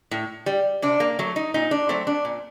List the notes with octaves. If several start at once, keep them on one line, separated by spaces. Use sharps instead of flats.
A2
G3
C3 D4
A#3
F#3 A3
D#4
A#2 D#4
D4
F#3 A3 C4
D4
A#2